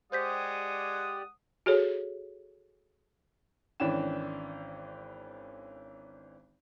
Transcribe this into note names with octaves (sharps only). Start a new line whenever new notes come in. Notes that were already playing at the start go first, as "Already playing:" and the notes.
G#3 G4 C5 D5 F#5 D#6 G6 B6
F#4 G#4 A4 C#5
G#1 E3 C#4 D4 G5 E7